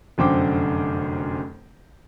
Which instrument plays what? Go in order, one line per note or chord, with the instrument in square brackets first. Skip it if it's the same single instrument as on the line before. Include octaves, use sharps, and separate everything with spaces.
[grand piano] F1 F#2 D3 C5 G5 D6